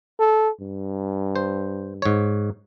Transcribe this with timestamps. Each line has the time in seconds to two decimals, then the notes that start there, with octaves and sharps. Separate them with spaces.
0.19 A4
0.61 G2
1.36 C5
2.02 G#2 C#5